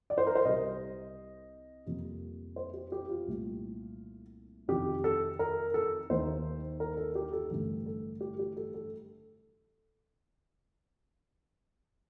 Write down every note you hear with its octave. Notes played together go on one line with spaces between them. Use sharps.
D5
C5
A#4
C5
C2 C3 G3 D#5
F2 C3 G3 A#3
C5
G4
G4
F4
C2 A#2 A3
F2 C3 D#3 G4
A4
A#4
A4
D#2 D#3 A#3 C5
A#4
A4
G4
A4
A1 G2 D3 A3 A4
A4
G4
G4
A4
A4